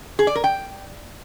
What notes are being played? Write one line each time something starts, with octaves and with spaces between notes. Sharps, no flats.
G#4
D5
A#4
G5